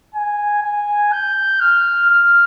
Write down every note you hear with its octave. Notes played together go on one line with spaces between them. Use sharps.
G#5
G#5
G6
F6
F6